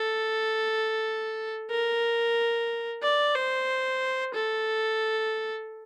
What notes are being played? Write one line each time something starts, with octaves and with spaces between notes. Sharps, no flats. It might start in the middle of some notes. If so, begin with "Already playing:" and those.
Already playing: A4
A#4
D5
C5
A4